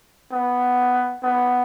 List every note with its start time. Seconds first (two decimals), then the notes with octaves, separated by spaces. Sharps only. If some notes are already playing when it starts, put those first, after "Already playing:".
0.32 B3
1.23 B3